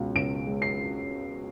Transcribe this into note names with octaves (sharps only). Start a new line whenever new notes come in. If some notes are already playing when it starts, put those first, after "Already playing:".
Already playing: C#2 B2 G#3
C#2 D7
G#3
C7